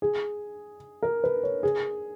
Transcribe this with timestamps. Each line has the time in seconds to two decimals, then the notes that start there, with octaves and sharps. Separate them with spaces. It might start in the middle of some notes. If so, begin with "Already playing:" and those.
0.02 G#4
1.03 A#4
1.24 B4
1.43 C#5
1.63 G#4